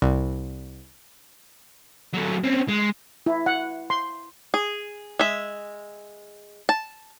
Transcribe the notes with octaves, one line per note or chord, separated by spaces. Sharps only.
C2
F#3 A3
C4 C#4
G#3
E4
F#5
C6
G#4
G#3 E5
A5